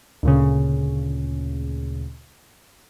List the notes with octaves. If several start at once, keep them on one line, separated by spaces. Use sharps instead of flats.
D2 A#2 C#3